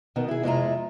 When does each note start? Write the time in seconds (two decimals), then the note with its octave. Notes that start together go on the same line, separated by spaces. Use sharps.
0.16 B2 D#3 B3
0.28 E4 G#4
0.43 F2 C3 G#3 E4 F4 A#5